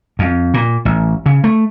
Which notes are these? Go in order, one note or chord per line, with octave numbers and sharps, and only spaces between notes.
F2
A#2
A1
C#3
A3